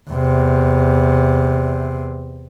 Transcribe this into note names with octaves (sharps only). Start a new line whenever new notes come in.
E2 C3